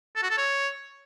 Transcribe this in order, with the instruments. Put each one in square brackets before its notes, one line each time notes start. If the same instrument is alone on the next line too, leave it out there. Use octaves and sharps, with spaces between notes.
[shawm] A4
F#4
A4
C#5